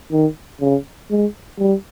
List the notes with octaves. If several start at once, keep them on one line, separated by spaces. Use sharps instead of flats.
D#3
C#3
G#3
G3